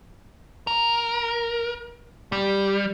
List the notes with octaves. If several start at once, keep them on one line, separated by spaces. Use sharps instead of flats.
A#4
G3